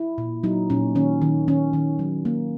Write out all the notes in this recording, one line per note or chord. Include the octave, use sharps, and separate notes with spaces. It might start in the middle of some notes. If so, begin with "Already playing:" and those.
Already playing: E4
A#2
F#3 D#4
A#2 C#4
D#3 C#4
D#3
D#3 C#4
D#3
F#3
A#3